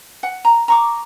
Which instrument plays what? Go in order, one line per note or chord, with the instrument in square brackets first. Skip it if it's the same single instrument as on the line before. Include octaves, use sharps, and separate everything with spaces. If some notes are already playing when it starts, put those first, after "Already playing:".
[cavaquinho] F#5
A#5
A#5 C#6 D6